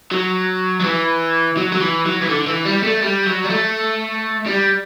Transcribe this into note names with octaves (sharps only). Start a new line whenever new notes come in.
F#3
F#3
E3
F#3
F#3
E3
F#3
E3
D3
E3
G3
A3
G3
F#3
G3
A3
G3